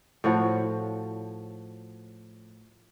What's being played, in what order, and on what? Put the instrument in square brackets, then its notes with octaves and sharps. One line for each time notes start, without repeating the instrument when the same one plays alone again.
[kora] A2 F3 F#4 C#5